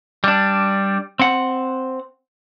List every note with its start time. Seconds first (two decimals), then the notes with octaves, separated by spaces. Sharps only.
0.24 G3 D4
1.19 C4 F#5